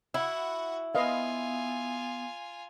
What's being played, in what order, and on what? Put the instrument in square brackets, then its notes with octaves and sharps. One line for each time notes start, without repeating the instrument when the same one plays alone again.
[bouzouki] E4 [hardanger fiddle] F#4 F#5
[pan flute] B3 [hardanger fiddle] F4 G#5 [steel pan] B4 D#5 F5